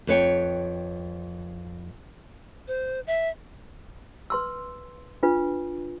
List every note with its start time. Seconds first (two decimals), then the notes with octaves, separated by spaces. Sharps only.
0.07 F2 B4 C#5 G5
2.68 C5
3.07 E5
4.30 B4 C6 E6
5.23 D4 F4 B4